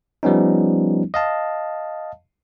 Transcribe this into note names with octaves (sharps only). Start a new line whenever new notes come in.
F3 G3 B3 C#4 D#4
D#5 F5 A5